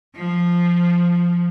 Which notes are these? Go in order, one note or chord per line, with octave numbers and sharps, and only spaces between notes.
F3